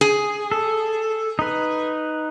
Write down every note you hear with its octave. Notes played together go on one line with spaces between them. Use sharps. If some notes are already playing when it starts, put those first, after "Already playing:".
G#4
A4
D#4 B4